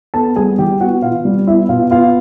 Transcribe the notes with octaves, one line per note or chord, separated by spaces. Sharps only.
B3 A4 A5
G3 G#4 G#5
E3 G4 G5
B3 F#4 F#5
B2 F4 F5
G3
B3 E4 E5
B2 F4 F5
B3 F4 F5